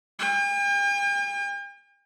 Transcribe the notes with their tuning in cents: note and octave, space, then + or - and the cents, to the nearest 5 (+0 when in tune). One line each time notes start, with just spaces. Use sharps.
G5 +45